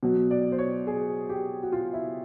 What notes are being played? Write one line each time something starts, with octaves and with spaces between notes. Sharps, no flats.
B2 F#3
D5
C5
C#5
G#4
G4
F#4
F4
E4